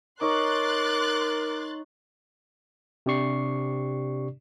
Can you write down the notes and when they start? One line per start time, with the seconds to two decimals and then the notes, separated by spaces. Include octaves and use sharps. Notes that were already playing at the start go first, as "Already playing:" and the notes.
0.21 D#4 A#4 C#5 C6 D6 F#6 A6
3.06 C3 D4 G4 D5 C#6 C7